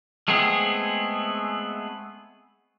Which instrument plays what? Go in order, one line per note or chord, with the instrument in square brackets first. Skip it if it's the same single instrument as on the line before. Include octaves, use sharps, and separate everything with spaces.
[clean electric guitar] G#3 A3 B3 C4 G#4